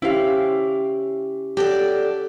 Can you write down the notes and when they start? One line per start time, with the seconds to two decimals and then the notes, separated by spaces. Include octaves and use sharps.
0.02 C#4 E4 G4 C5 F5
1.57 F#3 G4 A4 D5